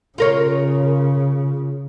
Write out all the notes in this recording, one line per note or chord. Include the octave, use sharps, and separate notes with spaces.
C#3 F4 A#4 C#5